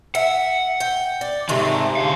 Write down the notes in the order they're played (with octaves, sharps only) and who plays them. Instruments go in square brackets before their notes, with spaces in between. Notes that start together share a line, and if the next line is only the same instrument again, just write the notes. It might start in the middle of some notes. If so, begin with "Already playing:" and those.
[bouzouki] E5 [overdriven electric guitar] F#5
[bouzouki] G5
D5
[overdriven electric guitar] G#2 D#3 [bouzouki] C3 G#3 A3
[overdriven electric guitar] D3 F5